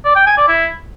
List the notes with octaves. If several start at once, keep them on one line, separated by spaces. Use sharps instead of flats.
D5
G5
G#5
D5
E4